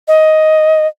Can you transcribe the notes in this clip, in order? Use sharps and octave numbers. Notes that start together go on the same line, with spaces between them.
D#5